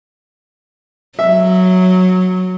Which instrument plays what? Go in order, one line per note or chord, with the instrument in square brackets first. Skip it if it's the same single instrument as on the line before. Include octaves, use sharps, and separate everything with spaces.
[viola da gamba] F#3 [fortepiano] E5